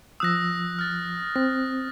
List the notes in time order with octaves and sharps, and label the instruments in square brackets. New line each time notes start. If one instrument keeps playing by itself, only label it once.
[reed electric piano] F3 E6 [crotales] D#6 F#6 A#6
[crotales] F6 A6
[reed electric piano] C4 [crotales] A#6